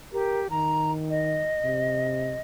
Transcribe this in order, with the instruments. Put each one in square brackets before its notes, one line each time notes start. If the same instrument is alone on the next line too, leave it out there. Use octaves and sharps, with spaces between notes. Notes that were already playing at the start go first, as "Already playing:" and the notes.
[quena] G4 [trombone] A#4
[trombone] D#3 [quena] A#5
[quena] D#5
[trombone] C3